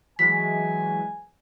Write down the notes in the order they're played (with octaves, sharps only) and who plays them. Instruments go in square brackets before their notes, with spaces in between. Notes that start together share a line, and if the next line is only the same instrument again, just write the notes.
[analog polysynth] E3 F#3 G#3 [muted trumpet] G#5 [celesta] B6